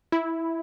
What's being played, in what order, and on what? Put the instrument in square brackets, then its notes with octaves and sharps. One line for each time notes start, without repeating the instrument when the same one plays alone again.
[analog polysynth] E4